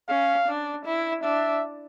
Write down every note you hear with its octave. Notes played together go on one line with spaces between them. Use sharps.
C#4 F5
D4
E4
D4 E5